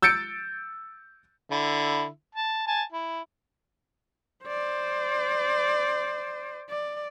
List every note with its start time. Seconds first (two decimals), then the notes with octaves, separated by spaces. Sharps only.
0.02 E6 G6 A6 C#7 D7
1.51 D3 E4
2.35 A5
2.67 G#5 A5
2.92 E4
4.44 C5 D5
6.69 D5